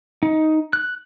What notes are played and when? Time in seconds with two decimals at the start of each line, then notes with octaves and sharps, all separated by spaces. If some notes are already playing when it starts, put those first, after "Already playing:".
0.23 D#4
0.73 F#6